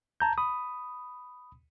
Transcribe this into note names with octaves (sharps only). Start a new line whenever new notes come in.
A5 A#5 G6
B5 D#6